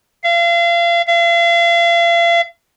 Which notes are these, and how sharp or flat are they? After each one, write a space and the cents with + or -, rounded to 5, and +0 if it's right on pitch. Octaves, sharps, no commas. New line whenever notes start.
F5 -35
F5 -40